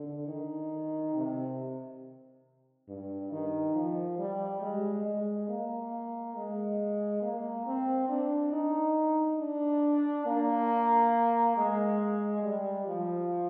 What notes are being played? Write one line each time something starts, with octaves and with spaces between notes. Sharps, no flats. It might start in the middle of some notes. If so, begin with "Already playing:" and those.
Already playing: D3
D#3
C3
G2
D#3
F3
G3
G#3
G#3
A#3
G#3
A#3
C4
D4
D#4
D4
A#3
G#3
G3
F3